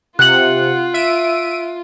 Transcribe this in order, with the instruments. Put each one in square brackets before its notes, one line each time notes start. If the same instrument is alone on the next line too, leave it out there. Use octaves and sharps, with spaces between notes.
[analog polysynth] C3 F#5 [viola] F4 [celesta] F#6 F#7
[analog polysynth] E5 D7 D#7